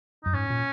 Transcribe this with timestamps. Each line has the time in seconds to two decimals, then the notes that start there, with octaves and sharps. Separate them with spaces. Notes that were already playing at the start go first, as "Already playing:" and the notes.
0.24 F#2 D#4
0.33 G#2 C#4
0.50 A#2